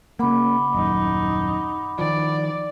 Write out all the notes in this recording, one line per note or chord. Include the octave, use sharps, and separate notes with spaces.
C#3 A#3 F#5 B5 D6
D#1 F#2 D#4
D#3 F3 D5